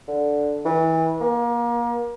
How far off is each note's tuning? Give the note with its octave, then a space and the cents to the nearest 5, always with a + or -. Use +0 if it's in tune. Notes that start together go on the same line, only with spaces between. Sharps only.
D3 -5
E3 -30
A#3 +30